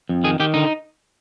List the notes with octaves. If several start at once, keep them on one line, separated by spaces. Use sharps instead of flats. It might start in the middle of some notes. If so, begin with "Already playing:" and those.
F2
D#3 G#4
D#3 G4
D3 D#4